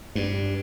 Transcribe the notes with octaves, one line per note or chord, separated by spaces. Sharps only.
G2